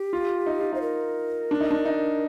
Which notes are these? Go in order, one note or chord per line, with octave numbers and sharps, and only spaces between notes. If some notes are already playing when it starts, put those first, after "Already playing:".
Already playing: G4
F4
D#4
F4
D#4 C5
A#4
D4
D#4
D4
D#4